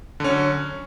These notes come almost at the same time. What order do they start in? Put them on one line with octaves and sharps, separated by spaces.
D3 C#4 F#3